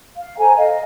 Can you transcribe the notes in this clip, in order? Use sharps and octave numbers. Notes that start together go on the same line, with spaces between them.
F5
A4 C5 G#5 A#5
D#5 F5